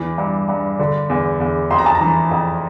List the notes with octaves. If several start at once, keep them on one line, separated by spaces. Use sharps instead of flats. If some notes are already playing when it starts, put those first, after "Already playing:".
Already playing: E2 E3
G2
G2
D3
E2
E2
F2 C6
A#5
A5
A#5
E3
F2